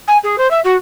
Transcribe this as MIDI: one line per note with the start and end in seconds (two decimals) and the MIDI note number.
0.07 0.17 80
0.23 0.36 68
0.38 0.49 72
0.50 0.60 76
0.64 0.75 66